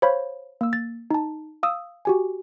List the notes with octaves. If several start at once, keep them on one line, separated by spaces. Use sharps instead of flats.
C5 C#5 F5 B5
A#3 E6
A6
D#4 A5
F5 D#6 E6
F#4 G4 G#5